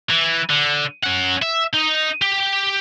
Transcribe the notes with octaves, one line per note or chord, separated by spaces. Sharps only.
E3
D3
C#4 F#5
E5
D#4
G4